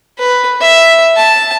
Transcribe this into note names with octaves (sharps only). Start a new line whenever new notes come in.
B4
E5
A5